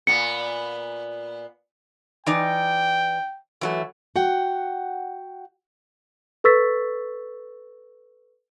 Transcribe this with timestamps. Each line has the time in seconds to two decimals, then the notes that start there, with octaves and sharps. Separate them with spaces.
0.07 A#2 B3 C#7
2.26 E3 D#4 D5 G5
3.61 E3 F#3 A3
4.16 F#4 F#5 G5
6.44 A4 B4 C#6 E6 A6 B6